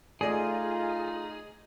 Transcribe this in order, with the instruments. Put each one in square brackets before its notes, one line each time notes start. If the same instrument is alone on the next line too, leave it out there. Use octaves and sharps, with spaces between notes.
[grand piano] A3 D5 D#5 [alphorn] D#4 [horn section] F4 [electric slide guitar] G#4